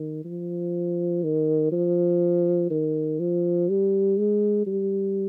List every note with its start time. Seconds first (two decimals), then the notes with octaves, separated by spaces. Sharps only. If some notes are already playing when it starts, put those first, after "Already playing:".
Already playing: D#3
0.25 F3
1.24 D#3
1.72 F3
2.70 D#3
3.20 F3
3.69 G3
4.18 G#3
4.67 G3